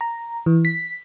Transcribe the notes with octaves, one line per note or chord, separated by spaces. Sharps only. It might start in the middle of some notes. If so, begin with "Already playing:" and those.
A#5
E3
B6